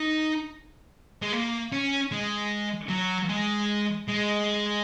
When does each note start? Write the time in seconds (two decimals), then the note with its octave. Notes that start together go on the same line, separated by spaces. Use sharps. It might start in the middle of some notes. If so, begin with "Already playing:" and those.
Already playing: D#4
1.22 G#3
1.33 A#3
1.72 C#4
2.12 G#3
2.90 F#3
3.29 G#3
4.08 G#3